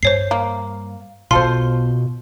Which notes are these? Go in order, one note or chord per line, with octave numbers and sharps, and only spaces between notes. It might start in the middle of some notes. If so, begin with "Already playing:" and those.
G2 G3 C5 C#5 C7
A#3
B1 B2 B3 F4 A4 C5 C6